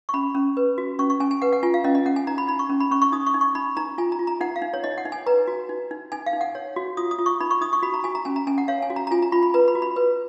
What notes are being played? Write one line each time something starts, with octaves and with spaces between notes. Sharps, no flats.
C#6
C#4 B5
C#4
B4
F#4
C#4 C#6
C#6
C#4 G#5
G#5
B4 F#5
F#5
F4 G#5
F5
C#4 D#5
D#5
C#4 F#5
G#5
D#4 A#5
B5
D#4 B5
C#6
C#4
B5
C#4 C#6
C#6
D#4 D#6
C#6
D#4
C#6
D#4 B5
D#4 A#5
F4 G#5
A#5
F4
A#5
D#4 F#5
F5
D#4
C#5
D#4 D#5
F#5
D#4
G#5
B4 A#5
F#4
D#4
D#4
D#4 G#5
F5
D#4
F#5
C#5
F#4
F4 D#6
D#6
F4
C#6
D#4 B5
C#6
D#4 D#6
C#6
F#4 B5
A#5
F#4 G#5
A#5
C#4 G#5
A#5
C#4 G#5
F#5
C#5 F5
G#5
F#4
A#5
A#5
F4 G#5
A#5
F4 B5
B5
B4 A#5
B5
F#4
B5
B4